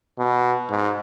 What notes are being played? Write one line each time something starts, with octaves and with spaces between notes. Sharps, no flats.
B2
G#2